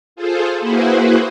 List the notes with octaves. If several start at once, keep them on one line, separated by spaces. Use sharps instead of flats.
F4 G#4 A4 C5
A#3 E4 F#4 G#4 B4 C5